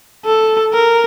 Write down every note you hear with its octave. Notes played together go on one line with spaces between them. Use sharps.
A4
A#4